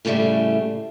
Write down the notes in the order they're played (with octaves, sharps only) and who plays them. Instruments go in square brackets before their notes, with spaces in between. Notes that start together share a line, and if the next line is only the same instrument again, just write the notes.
[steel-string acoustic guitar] F#2 A2 C#3 G3 A3